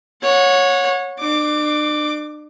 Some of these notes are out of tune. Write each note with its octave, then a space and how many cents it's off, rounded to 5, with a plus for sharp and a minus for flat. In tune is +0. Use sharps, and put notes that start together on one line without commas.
C#5 -5 F#5 -30
D4 +40 D6 +0